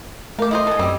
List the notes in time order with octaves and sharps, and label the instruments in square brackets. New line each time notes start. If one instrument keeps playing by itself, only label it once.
[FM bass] A3 [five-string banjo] G4 F5 [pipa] A#4
[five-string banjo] E4 F4 C5 [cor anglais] D#5
[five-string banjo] B3 [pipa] A4 G#5
[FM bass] F#2 [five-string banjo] G3 [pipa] C4 G4